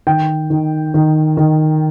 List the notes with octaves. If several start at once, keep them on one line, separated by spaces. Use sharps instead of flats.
D#3 G5
D#3
D#3
D#3